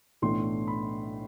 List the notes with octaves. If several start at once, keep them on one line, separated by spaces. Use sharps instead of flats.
B1 A2 E3 A3 D4 C6
B5